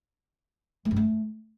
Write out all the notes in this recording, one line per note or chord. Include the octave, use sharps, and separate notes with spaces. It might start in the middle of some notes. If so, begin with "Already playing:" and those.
A3
F#2
A3